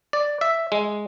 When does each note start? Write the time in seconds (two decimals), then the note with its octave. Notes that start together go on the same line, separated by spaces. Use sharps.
0.13 D5
0.41 E5
0.72 G#3